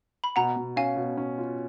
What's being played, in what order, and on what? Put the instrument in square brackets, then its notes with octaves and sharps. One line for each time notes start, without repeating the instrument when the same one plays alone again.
[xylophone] B5
[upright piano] B2 [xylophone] F#5 A#5
[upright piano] B2
[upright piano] C#4 [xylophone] F5 G#5
[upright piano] B2
C#4
F4